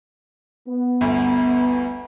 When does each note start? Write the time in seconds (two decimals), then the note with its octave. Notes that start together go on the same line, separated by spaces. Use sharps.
0.68 B3
1.01 G1 D2